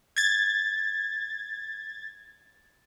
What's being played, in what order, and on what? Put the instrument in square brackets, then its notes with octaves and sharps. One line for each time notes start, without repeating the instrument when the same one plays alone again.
[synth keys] G#6 A6